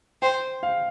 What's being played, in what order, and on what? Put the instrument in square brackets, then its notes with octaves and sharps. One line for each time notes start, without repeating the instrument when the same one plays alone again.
[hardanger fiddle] C5 [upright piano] G5
[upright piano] F5